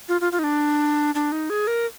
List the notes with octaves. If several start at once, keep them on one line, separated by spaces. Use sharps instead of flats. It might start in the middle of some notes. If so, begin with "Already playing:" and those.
F4
F4
F4
D#4
D4
D4
D#4
G#4
A#4